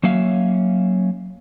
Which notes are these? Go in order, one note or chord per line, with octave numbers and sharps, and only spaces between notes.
F#3 A#3 C#4 E5 F5